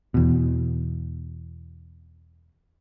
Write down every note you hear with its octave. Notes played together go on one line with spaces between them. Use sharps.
E2 B2